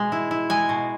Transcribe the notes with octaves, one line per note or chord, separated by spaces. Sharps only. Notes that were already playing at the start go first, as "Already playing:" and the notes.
Already playing: B2 G#3
E4
E4
G#3 G#5
B2